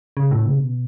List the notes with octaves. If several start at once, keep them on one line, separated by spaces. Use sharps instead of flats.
C#3
A2
C#3
B2